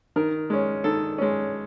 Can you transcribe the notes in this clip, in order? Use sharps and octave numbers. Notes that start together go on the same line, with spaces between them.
D#3 A#4
G#3 C#4
D#3 A4
G#3 C#4